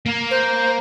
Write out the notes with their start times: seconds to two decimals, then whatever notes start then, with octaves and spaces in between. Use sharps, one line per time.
0.06 A#3
0.31 C5